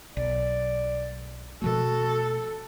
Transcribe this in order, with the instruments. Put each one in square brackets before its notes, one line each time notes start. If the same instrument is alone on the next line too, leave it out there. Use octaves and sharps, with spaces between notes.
[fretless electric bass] B1 [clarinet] D5
[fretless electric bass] B2 F3 A3 [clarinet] F#4 [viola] A4